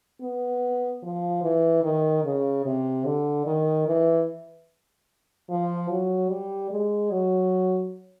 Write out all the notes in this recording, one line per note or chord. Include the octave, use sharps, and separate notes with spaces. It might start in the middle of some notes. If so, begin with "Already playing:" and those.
B3
F3
E3
D#3
C#3
C3
D3
D#3
E3
F3
F#3
G3
G#3
F#3